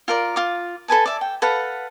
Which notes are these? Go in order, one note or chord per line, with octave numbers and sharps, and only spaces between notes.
F4 A#4 D5
F4 D6
A4 B4 G#5 A5
D5 E5
G5
A4 B4 F5 F#5